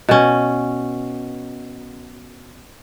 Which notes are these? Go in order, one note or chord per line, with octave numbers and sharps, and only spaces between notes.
B2 C#4